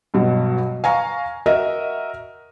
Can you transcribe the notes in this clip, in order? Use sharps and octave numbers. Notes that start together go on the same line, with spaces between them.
G2 B2 F#3
F5 G#5 A#5 C#6
F#4 A#4 D#5 E5